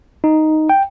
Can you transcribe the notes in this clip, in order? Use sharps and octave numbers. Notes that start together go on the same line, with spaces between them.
D#4
G5